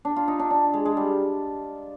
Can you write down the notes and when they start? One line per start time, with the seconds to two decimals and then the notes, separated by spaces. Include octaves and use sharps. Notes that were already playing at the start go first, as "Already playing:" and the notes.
0.05 D4
0.16 F4
0.28 D#4
0.40 D4
0.51 D4
0.74 G#3
0.85 G#3
0.97 G3